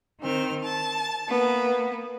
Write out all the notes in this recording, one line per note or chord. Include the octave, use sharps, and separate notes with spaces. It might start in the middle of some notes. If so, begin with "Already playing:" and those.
D#3 C4 F6
A5
A#3 B3